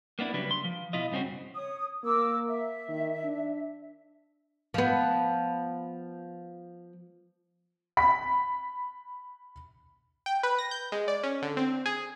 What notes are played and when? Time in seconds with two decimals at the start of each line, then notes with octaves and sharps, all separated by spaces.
0.19 A#3 B3 D4 E4
0.33 C#3 F#3 G3 D4 B4
0.51 C6
0.64 F3
0.93 B2 E4 F4 D#5
1.11 G2 C#3 C4 C#4 F#4
1.55 C#5 D#6
2.04 A#3 A#4 D6 E6
2.48 E5
2.88 D#3
3.24 D4
4.74 F3 B3
7.97 B5 B6
10.26 G5
10.43 B4
10.59 A#6
10.71 G6
10.92 G#3
11.08 D5
11.23 C#4
11.42 D3
11.57 C4
11.86 G#4